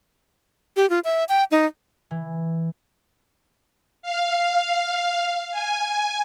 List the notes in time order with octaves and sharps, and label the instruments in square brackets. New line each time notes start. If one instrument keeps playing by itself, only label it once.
[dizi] G4
F4
E5
G5
D#4
[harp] E3
[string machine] F5
G#5